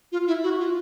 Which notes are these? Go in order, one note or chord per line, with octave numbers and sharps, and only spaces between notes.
F4
E4
F#4
F4